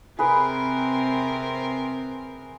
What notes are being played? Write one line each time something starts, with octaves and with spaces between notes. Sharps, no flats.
C3 C4 G#4 A#4 B4 B5